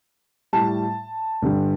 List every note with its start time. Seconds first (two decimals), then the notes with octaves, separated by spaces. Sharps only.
0.53 A2 G3 A5
1.42 G2 D3 G3